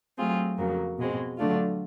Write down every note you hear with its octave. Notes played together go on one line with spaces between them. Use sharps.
F#3 A3 C4 F4 G#4
F2 C#3 F#3 A#3
B2 G#3 C4
D3 F#3 A3 D4 F4